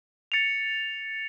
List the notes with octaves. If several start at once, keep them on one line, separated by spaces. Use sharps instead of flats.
A6 C#7 F7